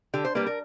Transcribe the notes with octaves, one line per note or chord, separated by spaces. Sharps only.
D3 G4
C5
G3 A#3 B4
A#4